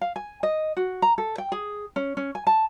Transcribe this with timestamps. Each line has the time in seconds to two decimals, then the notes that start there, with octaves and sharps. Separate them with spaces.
0.01 F5
0.16 G#5
0.43 D#5
0.77 F#4
1.02 A#5
1.18 A4
1.38 G5
1.52 G#4
1.96 C#4
2.17 C#4
2.35 G#5
2.47 A5